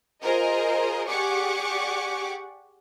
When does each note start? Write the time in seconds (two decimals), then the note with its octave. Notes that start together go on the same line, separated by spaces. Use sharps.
0.23 F4 G#4 A#4 C5 D#5
1.09 G4 G#4 D5 F#5 C#6 D6